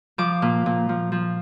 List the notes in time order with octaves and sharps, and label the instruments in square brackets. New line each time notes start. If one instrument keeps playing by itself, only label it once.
[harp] F3 D6
A#2
A#2
F3
F3